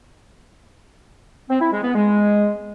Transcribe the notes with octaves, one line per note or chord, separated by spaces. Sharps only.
C4
E4
G#3
B3
G#3